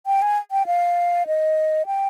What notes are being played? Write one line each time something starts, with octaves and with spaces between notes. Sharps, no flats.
G5
G#5
G5
F5
D#5
G5